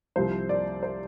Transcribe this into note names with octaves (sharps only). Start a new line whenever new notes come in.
C2 C3 F3 C5
D5
C5